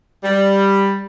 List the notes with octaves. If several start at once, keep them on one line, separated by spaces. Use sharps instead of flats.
G3